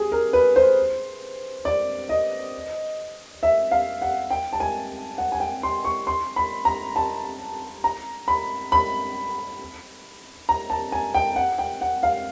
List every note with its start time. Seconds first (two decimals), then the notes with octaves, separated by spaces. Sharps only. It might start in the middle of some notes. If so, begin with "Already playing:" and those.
Already playing: G4 G#4
0.12 A#4
0.33 B4
0.56 C5
1.65 D5
2.09 D#5
3.43 E5
3.71 F5
4.02 F#5
4.30 G5
4.53 A5
4.60 G#5
5.18 F#5
5.32 G#5
5.40 G5
5.63 C6
5.85 C#6
6.07 C6
6.36 B5
6.65 A#5
6.96 A5
7.84 A#5
8.28 B5
8.72 B5
10.49 A#5
10.70 A5
10.92 G#5
11.14 G5
11.36 F#5
11.58 G5
11.81 F#5
12.03 F5